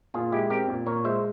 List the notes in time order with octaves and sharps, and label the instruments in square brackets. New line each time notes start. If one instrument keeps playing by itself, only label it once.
[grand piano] A#2 [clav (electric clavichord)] F4 G#4
[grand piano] G#3 [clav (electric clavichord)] E4 G4
[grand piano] C4 [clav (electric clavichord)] G4 A#4
[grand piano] A#2
[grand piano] A#2 [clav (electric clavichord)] A#4 C#5
[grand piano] G#3 [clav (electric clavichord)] C5 E5